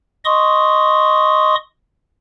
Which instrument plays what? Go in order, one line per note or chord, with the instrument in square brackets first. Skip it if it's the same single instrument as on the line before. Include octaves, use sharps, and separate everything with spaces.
[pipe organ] D#5 C6 C#6 D#6